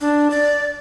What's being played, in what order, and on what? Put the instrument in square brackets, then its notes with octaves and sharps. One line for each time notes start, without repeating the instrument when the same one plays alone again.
[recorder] D4
D5